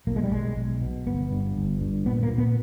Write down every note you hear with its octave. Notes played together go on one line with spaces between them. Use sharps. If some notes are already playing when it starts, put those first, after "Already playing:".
B1 A#3
G#3
G3
B1 G#3
B1
B2
G1 B3
G2
G1
G2
A#2 B3
A#3
A#2
B3